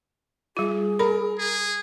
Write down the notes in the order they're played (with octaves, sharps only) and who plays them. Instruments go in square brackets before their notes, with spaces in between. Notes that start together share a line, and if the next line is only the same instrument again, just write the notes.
[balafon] G3 F4 [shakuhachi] G#4
[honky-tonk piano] A#4 [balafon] B5
[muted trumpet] G#4